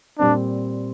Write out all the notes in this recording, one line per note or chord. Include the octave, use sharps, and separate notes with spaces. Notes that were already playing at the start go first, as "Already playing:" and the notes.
A#2 G3 C4 D4